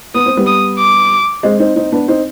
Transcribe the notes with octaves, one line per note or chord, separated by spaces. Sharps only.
B3 D#6
C4
G3 B3
D#6
D6
G#3 C4
C4 D#4
C4 D#4
B3 D4
C4 D#4